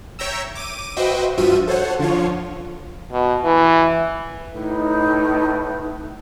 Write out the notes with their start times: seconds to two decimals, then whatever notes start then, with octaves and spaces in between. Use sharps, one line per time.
0.19 C#5 E5 G5 A#5 E6
0.55 D6 D#7
0.96 F#4 B4 C5 D#5 E5 G5
1.38 G2 F3 F4 F#4 E5 D#7
1.67 A4 C5 C#5 F#5
1.99 D3 F3 F4 C#5
3.12 B2
3.45 E3
4.54 A2 D#4 B4